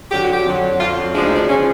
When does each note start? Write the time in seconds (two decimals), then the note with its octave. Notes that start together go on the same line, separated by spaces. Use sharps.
0.11 F2 D3 F#3 G4
0.23 F#4
0.33 G4
0.45 F2 D3 F#3
0.79 F2 D3 F#3 F4
1.14 D2 C#3 F3 G#3 D4
1.25 D#4
1.35 D4
1.48 C#3 F3 G#3 C#4